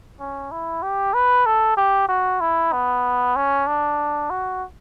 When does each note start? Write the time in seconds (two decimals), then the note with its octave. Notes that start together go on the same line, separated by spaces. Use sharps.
0.20 C#4
0.51 E4
0.83 G4
1.14 B4
1.46 A4
1.77 G4
2.08 F#4
2.41 E4
2.73 B3
3.36 C#4
3.67 D4
4.30 F#4